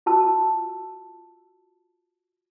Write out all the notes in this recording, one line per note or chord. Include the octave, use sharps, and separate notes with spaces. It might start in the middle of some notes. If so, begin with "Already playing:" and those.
F4 F#4 A5 E6